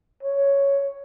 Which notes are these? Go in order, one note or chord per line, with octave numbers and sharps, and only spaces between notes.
C#5